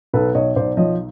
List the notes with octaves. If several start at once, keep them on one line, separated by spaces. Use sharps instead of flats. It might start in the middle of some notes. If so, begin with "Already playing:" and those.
B1 A4 B4
B1 C#5 D#5
B1 C5 D5
F3 C#5 D#5